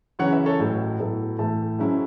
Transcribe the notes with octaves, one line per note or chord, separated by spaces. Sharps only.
F#2 C#3 E3 C#4 C#5 F#5
B4 E5
A4 C#5
A1 A2 F#3
A2 F#3 B3 E4 A4
A2 E3 A3 E5 A5
F#1 F#2 F#3 C#4 E4